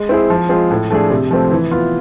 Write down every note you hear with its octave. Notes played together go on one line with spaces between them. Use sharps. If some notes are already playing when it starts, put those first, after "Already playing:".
Already playing: G#3
C4 E4 G#4
F3
G#3 C4 F4 G#4
A2
F3 A3 D4 G#4
C3
F3 A3 C4
E3
B3 F4